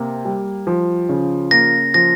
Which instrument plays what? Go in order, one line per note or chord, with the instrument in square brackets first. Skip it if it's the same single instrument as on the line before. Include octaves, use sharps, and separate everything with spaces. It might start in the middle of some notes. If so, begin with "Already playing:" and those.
Already playing: [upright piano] C3 A#3
G3
F3
C#3
[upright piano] A#3 [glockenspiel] A#6
[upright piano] F3 [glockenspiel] A#6